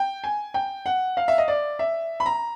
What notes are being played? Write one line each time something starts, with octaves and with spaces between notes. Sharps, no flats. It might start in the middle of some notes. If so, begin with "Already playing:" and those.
Already playing: G5
G#5
G5
F#5
F5
E5
D#5
D5
E5
B5
A#5